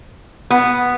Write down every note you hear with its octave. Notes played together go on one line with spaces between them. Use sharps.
B3